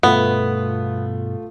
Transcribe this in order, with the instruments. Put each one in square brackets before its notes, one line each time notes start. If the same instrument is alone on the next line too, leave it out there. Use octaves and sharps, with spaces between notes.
[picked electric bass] G2 B2 [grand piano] A3 F4 [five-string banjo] B3